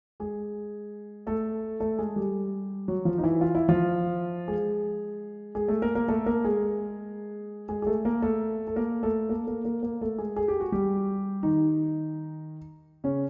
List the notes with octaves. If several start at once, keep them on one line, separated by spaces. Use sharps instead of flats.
G#3 G#4
A3 A4
A3 A4
G#3 G#4
G3 G4
F#3 F#4
F3 F4
D#4
E3 E4
F4
E4
F3 F4
G#3 G#4
G#3 G#4
A3 A4
A#3 A#4
A#3 A#4
A3 A4
A#3 A#4
G#3 G#4
G#3 G#4
G#4
A3 A4
A#3 A#4
A3 A4
A4
A#3 A#4
A3 A4
A#3 A#4
A#3 A#4
A#3 A#4
A#3 A#4
A3 A4
G#3 G#4
G#4
G4
F#4
G3 G4
D#3 D#4
C#3 C#4